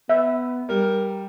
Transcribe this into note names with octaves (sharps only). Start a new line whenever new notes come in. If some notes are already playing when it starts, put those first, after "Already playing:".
B3 E5
G3 A#4